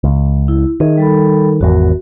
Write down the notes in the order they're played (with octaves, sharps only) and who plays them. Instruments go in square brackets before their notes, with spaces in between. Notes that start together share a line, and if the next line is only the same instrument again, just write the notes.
[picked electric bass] C#2
[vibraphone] E4
[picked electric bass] D#3 [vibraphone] G#4 D#5 E5
[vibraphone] G3 A4 B5
[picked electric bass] G#1 E2 [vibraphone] F#4 A#4